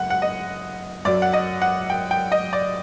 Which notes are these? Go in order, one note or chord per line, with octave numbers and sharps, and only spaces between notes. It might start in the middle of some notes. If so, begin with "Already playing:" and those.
Already playing: F#1 F#2 F#5
F#5
D#5
F#2 F#3 D5
F#5
D#5
F#5
G5
G5
D#5
D5